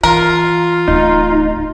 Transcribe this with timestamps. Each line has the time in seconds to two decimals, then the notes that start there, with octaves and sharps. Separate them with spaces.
0.03 E3 F4 A#4
0.88 D1 D#4